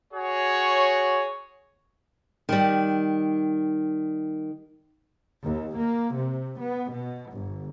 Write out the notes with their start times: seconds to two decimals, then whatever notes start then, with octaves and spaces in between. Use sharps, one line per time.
0.13 F#4 G#4 C#5
2.49 D#3 G3
5.42 D#2
5.77 A#3
6.13 C3
6.59 B3
6.90 B2
7.31 G1